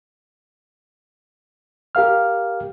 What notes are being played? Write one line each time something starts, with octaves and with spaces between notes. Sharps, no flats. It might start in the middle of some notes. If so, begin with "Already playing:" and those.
G4 A#4 F5 F6